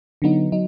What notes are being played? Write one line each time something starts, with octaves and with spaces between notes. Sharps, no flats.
D3 F#3 B3 D#4
F#3 D#4